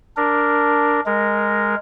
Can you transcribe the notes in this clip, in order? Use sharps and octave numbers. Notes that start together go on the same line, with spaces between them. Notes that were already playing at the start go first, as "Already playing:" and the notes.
D4 A#4
G#3 A#4